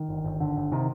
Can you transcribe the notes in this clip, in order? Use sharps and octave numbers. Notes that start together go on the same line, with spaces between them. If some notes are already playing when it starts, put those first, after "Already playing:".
Already playing: D#3
G1
G1
G1 D3
G1
C3 D#3